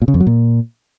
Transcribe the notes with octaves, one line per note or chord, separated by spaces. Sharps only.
A#2
C#3
F2
F#3
A#2